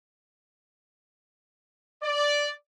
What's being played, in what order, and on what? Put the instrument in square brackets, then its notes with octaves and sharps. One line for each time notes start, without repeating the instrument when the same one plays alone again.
[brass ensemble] D5